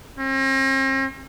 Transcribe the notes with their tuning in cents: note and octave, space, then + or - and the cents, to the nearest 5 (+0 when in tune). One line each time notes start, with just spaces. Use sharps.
C4 +45